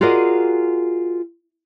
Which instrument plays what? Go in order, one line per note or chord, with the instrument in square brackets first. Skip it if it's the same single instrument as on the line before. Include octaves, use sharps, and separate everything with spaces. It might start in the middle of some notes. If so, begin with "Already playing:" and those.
[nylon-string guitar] F4 F#4 G#4 A#4 D5 D#5